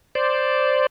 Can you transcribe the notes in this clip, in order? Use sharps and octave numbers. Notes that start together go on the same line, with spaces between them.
C5 D5